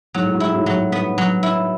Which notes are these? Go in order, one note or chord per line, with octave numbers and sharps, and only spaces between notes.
G#2 F#3
A2
G#2
A2 E4
G#2
A2 F#3
G#2
G2 B3
F#3
E4